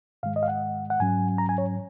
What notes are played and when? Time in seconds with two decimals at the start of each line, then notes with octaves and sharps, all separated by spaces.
0.23 G#2 D#3 G#3 F5
0.36 D#5
0.43 F5
0.48 F#5
0.90 F#5
1.00 G#2 F#3 C#4 G#5
1.38 A#5
1.49 G#5
1.58 C#5